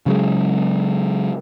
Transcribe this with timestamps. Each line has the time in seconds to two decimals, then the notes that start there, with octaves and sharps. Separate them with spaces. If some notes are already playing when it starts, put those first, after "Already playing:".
0.06 C#3 F#3 G#3